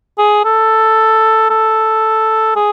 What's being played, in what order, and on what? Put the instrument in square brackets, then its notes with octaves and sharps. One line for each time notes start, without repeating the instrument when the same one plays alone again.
[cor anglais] G#4
A4
A4
G#4